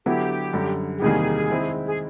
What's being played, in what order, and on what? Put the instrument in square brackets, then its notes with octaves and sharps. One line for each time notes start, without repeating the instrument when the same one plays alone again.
[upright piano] D3 F#3 B3 E4 [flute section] G4
[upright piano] F#2 D3 G3
[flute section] G4
[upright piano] E2 C3 D#3 G3 A#3 [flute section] G#4
[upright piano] D#3 G#3 C4 E4
[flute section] G#4